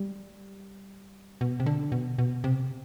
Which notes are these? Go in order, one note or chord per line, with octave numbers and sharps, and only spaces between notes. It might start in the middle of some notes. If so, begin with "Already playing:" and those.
Already playing: G3
B2
C3
D3
B2
B2
C3